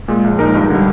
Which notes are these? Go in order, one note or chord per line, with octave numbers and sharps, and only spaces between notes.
A#2 G#3
A#1
A#2 G#3 D#4 A#4
G2
D3 G3